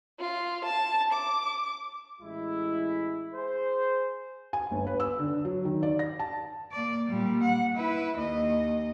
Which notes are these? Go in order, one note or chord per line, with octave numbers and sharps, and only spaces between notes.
F4
A5
D6
A1 G#3 E4
G#4 C5
G#5
G1
B4
E6
D3
F#3
D#3
D5
A#6
A5
A#3 D5
A#2 G3
F#5
E4 B4
D#2 D#5